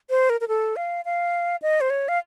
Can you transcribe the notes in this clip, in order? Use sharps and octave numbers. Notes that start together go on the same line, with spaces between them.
C5
A#4
A#4
A4
F5
F5
D#5
C5
C#5
F5